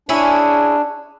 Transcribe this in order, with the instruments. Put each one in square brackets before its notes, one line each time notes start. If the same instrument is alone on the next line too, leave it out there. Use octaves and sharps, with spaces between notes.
[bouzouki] C#4 E4 G#4 [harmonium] D4